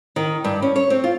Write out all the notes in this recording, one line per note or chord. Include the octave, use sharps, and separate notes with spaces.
D#3
G2
C#4
C#5
C4
F4